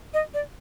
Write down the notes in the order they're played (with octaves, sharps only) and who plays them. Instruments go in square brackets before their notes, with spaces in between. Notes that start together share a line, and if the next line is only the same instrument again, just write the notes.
[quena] D#5
D5